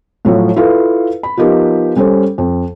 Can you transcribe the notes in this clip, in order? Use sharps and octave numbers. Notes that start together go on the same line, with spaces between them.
A2 F3 F#3
E4 F4 A4 B4 F5
B5
F3 B3 D#4 G4 A#4
G3 C#4 A4 C5
F2